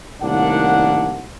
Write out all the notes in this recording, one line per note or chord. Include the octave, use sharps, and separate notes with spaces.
C2 A2 D#3 A#3 D4 F#5